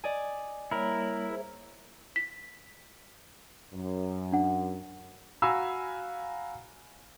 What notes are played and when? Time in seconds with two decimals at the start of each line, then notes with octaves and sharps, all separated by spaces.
0.04 D5 D#5 G#5
0.71 G3 A#3 E4 A#4 C#5
1.30 G#4 C5 E5
2.16 B6
3.74 F#2
4.33 D4 F#5
5.42 F#4 F5 G#5 A#5 B5 E6